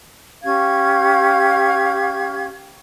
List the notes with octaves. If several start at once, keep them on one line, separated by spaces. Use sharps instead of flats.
C#4 G4 F5 G#6